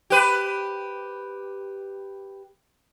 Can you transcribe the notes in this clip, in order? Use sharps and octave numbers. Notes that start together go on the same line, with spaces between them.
G4 B4